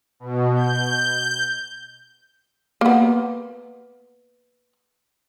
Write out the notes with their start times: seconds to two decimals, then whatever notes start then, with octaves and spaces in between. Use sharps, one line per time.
0.20 B2
0.56 G6
2.81 A#3 B3